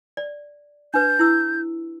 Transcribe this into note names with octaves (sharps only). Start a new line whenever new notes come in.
D5
D4 B4 G6
E4 E6